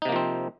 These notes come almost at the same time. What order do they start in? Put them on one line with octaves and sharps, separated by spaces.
D#4 C3 A#3 F3 C4